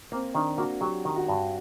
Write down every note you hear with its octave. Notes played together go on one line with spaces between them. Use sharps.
A#3 C4
D#3 D4
A#3 F#4
F#3 G4
D#3
F#4
G2